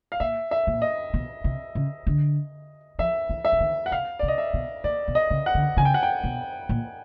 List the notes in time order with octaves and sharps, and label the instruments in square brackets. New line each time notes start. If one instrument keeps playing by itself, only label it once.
[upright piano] F5
[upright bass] A#2 [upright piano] E5
[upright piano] E5
[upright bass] A#2
[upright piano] D#5
[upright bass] B2
C3
C#3
D3
[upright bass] F3 [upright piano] E5
[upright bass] E3
[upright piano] E5
[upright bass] E3
D#3
[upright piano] F#5
[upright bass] C3 [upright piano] F5
[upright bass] C3 [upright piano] D5
[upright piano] D#5
E5
[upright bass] B2
[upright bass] A#2 [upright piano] D5
[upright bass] B2
[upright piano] D#5
[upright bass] C#3
[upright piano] F#5
[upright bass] D3
[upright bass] C#3 [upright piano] G#5
[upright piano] G5
F#5
G5
[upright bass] B2
A#2